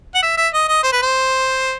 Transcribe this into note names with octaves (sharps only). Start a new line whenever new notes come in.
F#5
E5
E5
D#5
D#5
C5
B4
C5